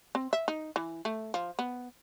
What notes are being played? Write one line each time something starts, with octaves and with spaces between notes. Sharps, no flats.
C4
E5
D#4
E3
A3
F3
B3